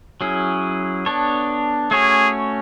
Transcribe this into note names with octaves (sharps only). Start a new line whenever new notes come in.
F#3 C#4 E4 G#4
B3 D4 A4 C#5
A3 C#4 F#4 G#4 C#5